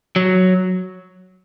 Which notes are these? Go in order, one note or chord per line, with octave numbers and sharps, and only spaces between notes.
F#3